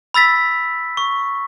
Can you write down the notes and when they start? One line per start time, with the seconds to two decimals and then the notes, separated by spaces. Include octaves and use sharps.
0.14 B5 E6 A6 B6
0.97 C#6